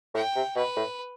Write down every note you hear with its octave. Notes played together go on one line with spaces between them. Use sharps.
A2 G5
C3
B2 B4
A2